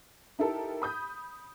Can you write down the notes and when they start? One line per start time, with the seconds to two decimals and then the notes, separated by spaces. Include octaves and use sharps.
0.39 D#4 E4 G4 A4 A#4
0.82 B5 D#6 G6